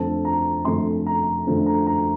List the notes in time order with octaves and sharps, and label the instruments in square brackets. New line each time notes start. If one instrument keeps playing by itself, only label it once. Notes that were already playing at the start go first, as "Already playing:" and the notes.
Already playing: [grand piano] F2 D3 A3 C4 A5
A#5
F2 D3 A3 C4 C6
A#5
F2 D3 A3 C4
A#5
A#5